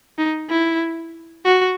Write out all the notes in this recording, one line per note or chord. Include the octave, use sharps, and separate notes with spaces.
D#4
E4
F#4